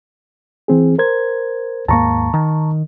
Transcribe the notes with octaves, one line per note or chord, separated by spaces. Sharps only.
E3 C4 G#4
A#4 C5 G#6
D#2 G#2 A#3 A5 A#5 C#6
D#3